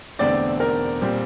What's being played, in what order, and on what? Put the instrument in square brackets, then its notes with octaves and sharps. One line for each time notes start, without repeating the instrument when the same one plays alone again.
[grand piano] E1 E2 D3 A3 C4 [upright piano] D5
[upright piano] A#4
[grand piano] A#2 G3 C4